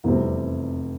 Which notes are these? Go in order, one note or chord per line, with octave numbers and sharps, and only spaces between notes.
F1 E2 C3 G3 C4